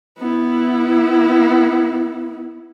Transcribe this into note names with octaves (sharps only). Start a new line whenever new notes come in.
B3 E4